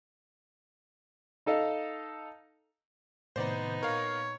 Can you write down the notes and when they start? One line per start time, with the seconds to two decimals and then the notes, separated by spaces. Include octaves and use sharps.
1.46 D#4 A4 D#5 F5
3.36 A2 C3 D#3 B3 D#4 C5 D5
3.83 A#2 A#4 C#5 F5